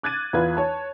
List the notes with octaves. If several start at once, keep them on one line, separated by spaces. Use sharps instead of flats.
D6 F#6 G#6 A6 D#7
E2 F4 B4 G#6
C#5 A5